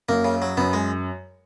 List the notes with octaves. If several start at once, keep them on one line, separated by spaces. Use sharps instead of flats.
F#2 A#3
C#3
F#3
F#2 B3
G#3